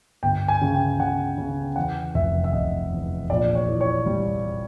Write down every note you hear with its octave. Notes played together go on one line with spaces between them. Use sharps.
G1 G5
G#5
C#3
G5
C#3 F#5
C#3
E2 F#5
F1 E5
E5
F1 D#5
E2
A#1 D5
C#5
E3
C#5
G3